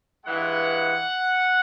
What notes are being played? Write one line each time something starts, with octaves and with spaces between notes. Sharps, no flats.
G2 E3 G#3 F#5